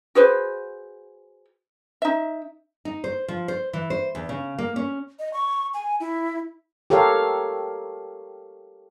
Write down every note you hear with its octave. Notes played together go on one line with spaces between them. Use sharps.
F#4 G#4 B4 C5
D#4 E5
D#4
C5
F3
C5
E3
C5
E2
C#3
A#3
C#4
D#5
C#6
G#5
E4
G4 A4 A#4 C#5 F5